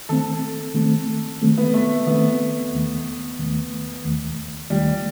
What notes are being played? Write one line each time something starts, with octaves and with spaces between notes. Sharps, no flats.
D#3 A3 C4 A4
D#3 A3 C4
D#3 A3 C4
B3
A3
D#3 A3 B3 C4
D#2 D#3 A3
D#2 D#3 A3
D#2 D#3 A3
D#2 D#3 G3 A3